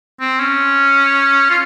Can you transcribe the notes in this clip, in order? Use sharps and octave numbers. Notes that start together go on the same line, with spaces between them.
C4
C#4
F4